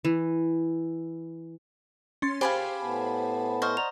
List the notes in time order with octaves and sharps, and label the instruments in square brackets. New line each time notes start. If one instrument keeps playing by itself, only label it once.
[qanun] E3
[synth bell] C#4 C6 A6
[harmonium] A#2 [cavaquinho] G4 G#4 F5 [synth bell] C5 G#5 B5
[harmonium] A2 B3 A5
[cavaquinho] C5 D#5 [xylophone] F#5 C#6 F6
[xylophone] D5 A#5 F7